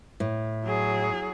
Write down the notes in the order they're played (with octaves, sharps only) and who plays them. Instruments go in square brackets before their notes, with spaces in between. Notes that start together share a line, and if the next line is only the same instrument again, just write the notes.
[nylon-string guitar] A2
[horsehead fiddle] F#3 G#4